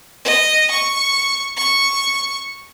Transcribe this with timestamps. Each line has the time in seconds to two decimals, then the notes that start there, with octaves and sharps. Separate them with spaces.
0.25 D#5
0.71 C#6
1.57 C#6